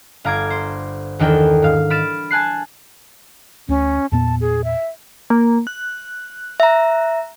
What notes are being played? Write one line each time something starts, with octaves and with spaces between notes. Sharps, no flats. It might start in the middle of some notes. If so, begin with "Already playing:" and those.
G1 F5 A#5 D6 G#6
C5
E2 D#3 D4 A4 A#4 G5
G#2 F5
B5 F6 A6 D7 E7
G#5 A5 F#6 C7
D2 C#4
E2 A#2 B3 A5
G#4
E5
A#3
F#6
E5 A#5